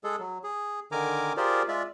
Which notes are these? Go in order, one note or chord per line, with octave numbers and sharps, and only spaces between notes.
G#3 G#4 A4
F#3
G#4
D3 D#3 A#4 G#5 A#5 D6
F4 G4 G#4 A#4 C5 D5
G#3 F4 D5 E5